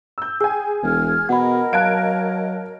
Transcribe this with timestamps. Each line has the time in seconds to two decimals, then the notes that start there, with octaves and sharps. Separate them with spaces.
0.18 E6 G6
0.41 G#4 G5 G#5 E6
0.83 E1 F6 G#6
1.29 B2 A#4 D#5 F#5 B5
1.73 F#3 F5 A5 F#6 G#6 D7